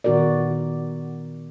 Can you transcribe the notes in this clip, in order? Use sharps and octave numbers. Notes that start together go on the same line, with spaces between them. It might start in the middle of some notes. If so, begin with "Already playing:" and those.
A#2 D#3 B3 F#4 A#4 D5